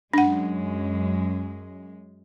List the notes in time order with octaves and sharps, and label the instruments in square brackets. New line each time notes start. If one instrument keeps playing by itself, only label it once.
[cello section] F#2 G#3 [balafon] D4 F#5